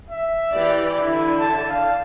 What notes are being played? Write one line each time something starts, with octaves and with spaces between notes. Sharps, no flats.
E5
E3 G4 D5
D3 E4
A5
F5